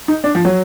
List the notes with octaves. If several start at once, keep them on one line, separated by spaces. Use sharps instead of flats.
D#4
D4
F3
F#3